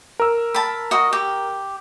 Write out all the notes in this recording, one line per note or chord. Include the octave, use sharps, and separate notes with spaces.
A#4 E6
A5 B5
F#4 D#5
G4